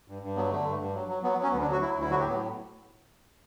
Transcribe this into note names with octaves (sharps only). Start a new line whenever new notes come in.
G2
G2
F#3 B3
D3 A3
G2
G2
F#3
F#3
F#3 B3
B3
F#3
C#4
D2 B3
D4
F#3
F#4
F#3 E4
D2
E4
F#3 F#4
G4
A2
B3